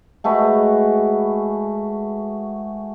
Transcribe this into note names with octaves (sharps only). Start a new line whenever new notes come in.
G#3 A3 F#4 B4